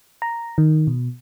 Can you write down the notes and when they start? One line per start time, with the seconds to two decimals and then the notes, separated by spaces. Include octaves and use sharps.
0.22 A#5
0.58 D#3
0.87 B2